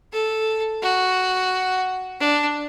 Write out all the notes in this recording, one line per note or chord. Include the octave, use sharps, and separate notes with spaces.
A4
F#4
D4